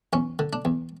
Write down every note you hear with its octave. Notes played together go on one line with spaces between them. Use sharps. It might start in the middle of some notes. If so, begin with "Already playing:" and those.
E2 C#4
D3
D4
E2